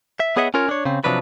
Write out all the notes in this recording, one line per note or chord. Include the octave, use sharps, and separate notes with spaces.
E5
B3 G#4 C#5 D#5 E5 F#5
C#4 F4 A#4 C#5
D4 C#5
C#3 C4
C3 F3 F#3 D4 B4